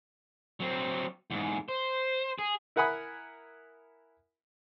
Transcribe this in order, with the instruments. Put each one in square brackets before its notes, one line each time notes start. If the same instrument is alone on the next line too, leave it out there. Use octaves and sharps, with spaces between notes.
[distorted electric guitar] F#3 C4
E2 G#2
C5
G#4
[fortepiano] E4 A#4 F#5 G#5 B5 D#6